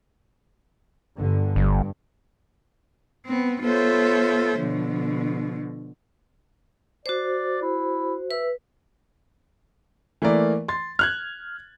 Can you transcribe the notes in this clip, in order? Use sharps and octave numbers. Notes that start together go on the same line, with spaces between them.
G1 G2 D3
G1 G2
B3 C4
B3 F4 A4 C5 C#5 E5
B2 D3 F3
F#4 C5 D5
E4
B4 E5
E3 A3 A#3 A#4 D5
C6 A6
F6 F#6 G#6